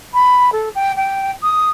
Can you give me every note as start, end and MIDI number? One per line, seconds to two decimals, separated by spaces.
0.14 0.50 83
0.52 0.69 69
0.75 0.92 79
0.97 1.32 79
1.43 1.70 87